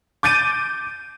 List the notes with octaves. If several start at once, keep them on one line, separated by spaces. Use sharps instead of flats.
D6 G6 A6 D7 D#7